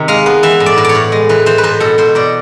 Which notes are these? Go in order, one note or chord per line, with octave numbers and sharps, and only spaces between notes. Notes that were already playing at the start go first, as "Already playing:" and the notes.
Already playing: C3 D#3
G#3 F5
B3
E3 E5
A2
D5
A2
C#5 D5
A2
G#3
E3 B4
E3 C5
B4
A2 C5
B2 A4
B2 C5
B2 D5